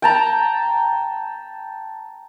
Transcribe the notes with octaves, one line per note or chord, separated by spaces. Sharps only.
G5 A5 A#5